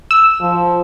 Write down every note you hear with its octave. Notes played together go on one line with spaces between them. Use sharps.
E6
F3